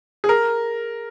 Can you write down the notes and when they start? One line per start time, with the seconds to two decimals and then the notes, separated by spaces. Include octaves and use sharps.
0.24 G#4
0.29 A#4